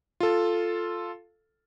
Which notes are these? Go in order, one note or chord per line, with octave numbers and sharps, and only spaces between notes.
F4 A4